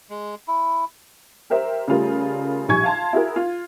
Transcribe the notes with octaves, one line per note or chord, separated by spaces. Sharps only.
G#3
E4
G4 A#4 C5 E5
C#3 G3 A3 F4 A#4
A#1 G3 G#5 C#6 G#6
F5 A5 C6
E4 F#4 G#4 A#4
F4